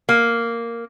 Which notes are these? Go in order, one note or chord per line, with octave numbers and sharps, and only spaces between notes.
A#3